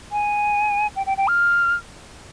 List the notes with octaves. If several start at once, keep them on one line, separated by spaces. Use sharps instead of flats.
G#5
G5
G5
G5
F6